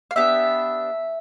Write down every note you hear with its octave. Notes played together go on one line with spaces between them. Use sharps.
F5
B3 D4 G4 E5